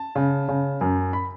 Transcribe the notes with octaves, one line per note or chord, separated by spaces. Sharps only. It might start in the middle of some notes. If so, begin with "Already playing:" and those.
Already playing: A5
C#3
C#3
F#2
B5